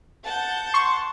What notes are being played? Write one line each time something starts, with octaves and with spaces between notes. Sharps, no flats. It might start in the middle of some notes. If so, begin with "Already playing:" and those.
F#5 A5 G6
C6 C#6